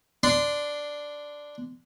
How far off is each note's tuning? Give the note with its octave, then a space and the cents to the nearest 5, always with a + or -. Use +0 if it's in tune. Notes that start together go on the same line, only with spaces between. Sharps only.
D4 +0 C6 -20